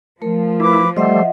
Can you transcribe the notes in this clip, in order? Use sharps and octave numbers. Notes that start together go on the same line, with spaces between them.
F3 A3 A#4
E4 B4 D6
G3 A3 C5 D#5 E5 F#5